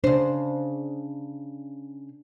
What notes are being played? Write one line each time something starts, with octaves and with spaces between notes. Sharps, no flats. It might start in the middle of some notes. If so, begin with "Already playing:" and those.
C#3 D4 C5